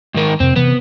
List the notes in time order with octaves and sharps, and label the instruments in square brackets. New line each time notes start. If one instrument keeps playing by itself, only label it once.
[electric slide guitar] G#2 D#3 A#4
[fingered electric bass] F2 C3 [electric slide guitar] C4
[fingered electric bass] C3 E3 [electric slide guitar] B3